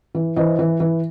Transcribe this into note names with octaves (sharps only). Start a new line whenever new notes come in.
E3
E3 C5 D#5
E3
E3